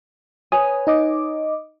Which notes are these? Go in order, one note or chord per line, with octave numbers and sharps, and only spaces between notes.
B4 C#5 G#5 D#6
D#4 D#5 D6